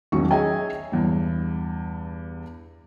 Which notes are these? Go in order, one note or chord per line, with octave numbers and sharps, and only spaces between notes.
E1 B1 D#3 C#4 C#6
G#4 C#5 D#5 E5 G#5
E2 G2